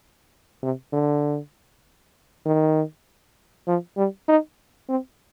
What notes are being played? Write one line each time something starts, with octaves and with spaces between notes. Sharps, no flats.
C3
D3
D#3
F3
G3
D#4
C4